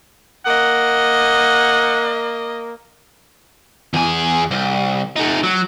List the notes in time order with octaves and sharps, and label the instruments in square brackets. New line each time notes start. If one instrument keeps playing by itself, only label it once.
[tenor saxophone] A#3 [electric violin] D#5 [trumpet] F#5
[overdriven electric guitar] E2 G#4
C2
A3 D#4
F#3